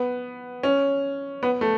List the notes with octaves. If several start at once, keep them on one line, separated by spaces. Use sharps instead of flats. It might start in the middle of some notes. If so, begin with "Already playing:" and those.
Already playing: B3
C#4
B3
A3